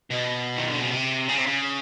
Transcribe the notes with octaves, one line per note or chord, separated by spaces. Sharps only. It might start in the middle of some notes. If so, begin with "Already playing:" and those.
B2
D#3
D3
C#3
C3
C#3
C3
C#3